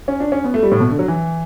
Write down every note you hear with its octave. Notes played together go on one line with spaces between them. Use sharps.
C#4
D4
C#4
B3
A3
G3
A2
B2
D3
F#3
E3